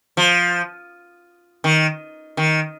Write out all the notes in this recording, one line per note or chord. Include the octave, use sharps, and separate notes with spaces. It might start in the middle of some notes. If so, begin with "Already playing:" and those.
F3
D#3
D#3